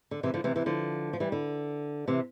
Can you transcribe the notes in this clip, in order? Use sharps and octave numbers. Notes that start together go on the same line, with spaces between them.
D3
C3 E3
D3 F3
C3 E3
C3 E3
D3 F3
F3
E3 G3
D3
C3 E3